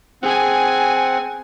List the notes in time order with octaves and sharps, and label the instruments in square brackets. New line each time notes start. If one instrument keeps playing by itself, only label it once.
[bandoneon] C4 F#5 [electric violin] G#4 G#5